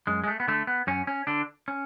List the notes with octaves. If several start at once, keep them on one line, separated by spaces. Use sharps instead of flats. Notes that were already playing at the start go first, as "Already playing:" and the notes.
F#2 G#3
G#3
A3
B3
D3 A3
B3
F#2 C#4
C#4
D3 D4
C#4